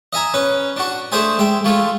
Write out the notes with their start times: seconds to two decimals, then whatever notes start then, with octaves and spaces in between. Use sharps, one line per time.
0.13 D#5 E5 G#5 A#5
0.34 C#4 B4
0.76 D4 F#4
1.12 A3 D4 G#4 C5 E5 G#5
1.39 G#3 E5 G5
1.64 G#3 A3 F4 A4